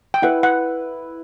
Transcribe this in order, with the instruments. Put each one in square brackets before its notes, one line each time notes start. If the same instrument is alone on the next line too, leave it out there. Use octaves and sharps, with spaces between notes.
[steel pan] G5
[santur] E4 B4 E5 [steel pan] F#5
[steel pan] F#5